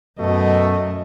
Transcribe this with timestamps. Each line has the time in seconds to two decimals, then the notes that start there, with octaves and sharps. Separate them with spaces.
0.19 F#2 B2 A3 D#5